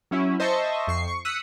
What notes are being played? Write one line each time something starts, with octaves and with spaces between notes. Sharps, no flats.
F#3 C#4 E4
C5 D#5 E5 A5 C#6
F2 C#6 C7
C#6
D#6 E6 F#6 B6 C#7